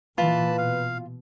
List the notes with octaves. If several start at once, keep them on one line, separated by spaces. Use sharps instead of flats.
A#2 E3 F4 B4 A5 B5
B2 F5